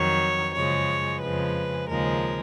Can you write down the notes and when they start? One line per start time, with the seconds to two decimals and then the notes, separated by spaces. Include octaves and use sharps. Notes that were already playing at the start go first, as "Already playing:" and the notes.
Already playing: F2 D#3 F#3 C#5
0.54 F#2 C#3 F3 G#3 C#5
1.20 F2 C#3 F3 G#3 B4
1.88 D#2 C#3 F3 G#3 A#4